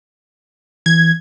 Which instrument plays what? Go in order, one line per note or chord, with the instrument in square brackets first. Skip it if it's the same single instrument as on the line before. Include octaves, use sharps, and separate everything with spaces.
[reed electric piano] E3 [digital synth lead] G#6